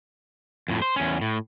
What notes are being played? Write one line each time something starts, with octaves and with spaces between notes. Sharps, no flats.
F2 A2
C5
E2 C#4
A2